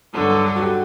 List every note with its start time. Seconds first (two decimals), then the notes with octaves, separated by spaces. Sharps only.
0.14 G2 D3 F#3 A4
0.30 A4
0.46 A4
0.56 F#4
0.62 G4